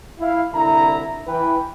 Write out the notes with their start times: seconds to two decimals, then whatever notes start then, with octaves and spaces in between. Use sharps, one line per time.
0.20 E4 F5
0.53 C2 D3 E4 E5 A#5
1.28 E3 B4 G5